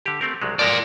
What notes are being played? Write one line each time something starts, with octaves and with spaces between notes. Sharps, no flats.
D3 G4
A3 C4 A#4
C2 F#3 G#3
F3 G#3 A#4 D5